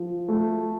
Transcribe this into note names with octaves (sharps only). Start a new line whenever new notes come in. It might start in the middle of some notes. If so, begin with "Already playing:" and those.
Already playing: F3
A3